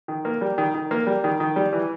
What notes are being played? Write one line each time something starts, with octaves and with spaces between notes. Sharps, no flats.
D#3
A#3
G3
D#3
D#3
A#3
G3
D#3
D#3
G3
E3